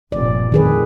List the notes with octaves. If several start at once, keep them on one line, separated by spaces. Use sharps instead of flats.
F1 G2 A#2 D5
G1 F2 A2 D#3 G#4 B4